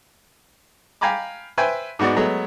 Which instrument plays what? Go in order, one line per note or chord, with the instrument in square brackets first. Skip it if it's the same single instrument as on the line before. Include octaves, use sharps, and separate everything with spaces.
[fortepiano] F5 G5 G#5 A#5 B5 D6
B4 C5 E5 G5 G#5
G#2 G#3 B3 F#4 D5
F#3 G#3 A3 B3